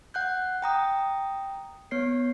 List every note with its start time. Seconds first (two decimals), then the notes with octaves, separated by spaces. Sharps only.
0.14 F#5 F#6 G6
0.62 G5 A#5 D#6
1.91 B3 C#5 C7